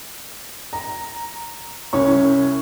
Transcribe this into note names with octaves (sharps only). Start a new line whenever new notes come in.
A#5
C2 C#4 C#6